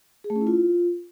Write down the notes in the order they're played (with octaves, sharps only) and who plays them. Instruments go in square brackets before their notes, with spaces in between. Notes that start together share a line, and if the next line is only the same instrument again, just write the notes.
[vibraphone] G#4
A3
C#4
E4
F4